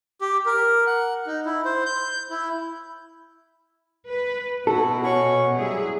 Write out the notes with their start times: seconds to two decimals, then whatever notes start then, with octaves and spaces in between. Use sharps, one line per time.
0.21 G4
0.46 A#4
0.87 F#5
1.27 D#4
1.46 E4
1.65 C5
1.86 G6
2.30 E4
4.08 B4
4.67 B2 E4 F#4 A4
5.03 C#4 F#4 C#5
5.57 F#3 G3 E4 G#4